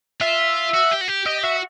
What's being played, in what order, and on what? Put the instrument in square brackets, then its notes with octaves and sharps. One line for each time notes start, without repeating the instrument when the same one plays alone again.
[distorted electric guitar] F4 [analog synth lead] E5
[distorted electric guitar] F#4
G4
F#4
G4
[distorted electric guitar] G4 [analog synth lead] D#5
[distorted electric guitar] F#4 [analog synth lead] E5